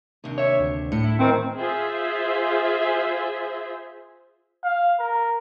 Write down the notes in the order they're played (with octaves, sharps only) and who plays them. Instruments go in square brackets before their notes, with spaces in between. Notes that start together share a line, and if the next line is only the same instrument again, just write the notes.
[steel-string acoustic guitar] D#2 C3 D4
[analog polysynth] C#5 E5
D2
[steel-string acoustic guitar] A2 [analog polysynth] C#7
[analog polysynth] E4
[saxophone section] D#3 C4 [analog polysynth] E3 C5
[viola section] F4 G#4 C5 E5
[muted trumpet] F5
A#4